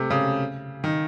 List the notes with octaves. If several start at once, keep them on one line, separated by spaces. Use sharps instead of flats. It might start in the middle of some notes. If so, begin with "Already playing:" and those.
Already playing: C3 A3
C#3
D#3